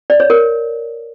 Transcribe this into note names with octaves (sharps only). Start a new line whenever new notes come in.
D5
C#5
A#4